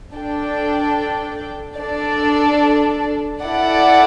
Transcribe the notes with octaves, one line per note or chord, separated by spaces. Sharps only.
D4 A4 D5 G5
D4 A4 D5
E4 A4 D5 F#5